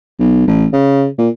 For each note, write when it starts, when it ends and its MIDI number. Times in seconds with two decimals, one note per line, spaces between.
0.19 0.43 35
0.48 0.66 33
0.73 1.07 49
1.18 1.29 46